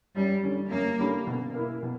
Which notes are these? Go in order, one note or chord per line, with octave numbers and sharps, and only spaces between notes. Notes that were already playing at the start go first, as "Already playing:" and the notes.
F#2 G3
D3 G3 C#4
F#2 A#3
D3 G3 C#4
B2
A#3 E4
B2